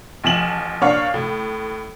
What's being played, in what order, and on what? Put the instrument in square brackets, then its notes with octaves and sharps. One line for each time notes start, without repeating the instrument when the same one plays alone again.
[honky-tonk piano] A1 F3 G#5 E7 F#7
A#2 D4 C#5 F5
A2